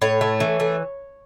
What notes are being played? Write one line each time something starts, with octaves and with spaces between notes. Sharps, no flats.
A2 C#5
A3
E3
A3